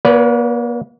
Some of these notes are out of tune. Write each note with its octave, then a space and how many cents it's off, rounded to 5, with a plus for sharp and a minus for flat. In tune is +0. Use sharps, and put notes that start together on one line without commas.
A#3 +40 B4 +0 D5 -45